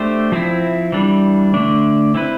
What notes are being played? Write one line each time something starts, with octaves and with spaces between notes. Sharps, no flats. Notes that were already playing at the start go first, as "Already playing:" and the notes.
Already playing: A3 D4 G4 C5
F3 C4 E4
E3 G3 D4
D3 A3 D4
C4 E4 B4